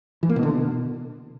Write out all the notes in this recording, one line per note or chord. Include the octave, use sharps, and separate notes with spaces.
E3
A#3
B2
D3
B2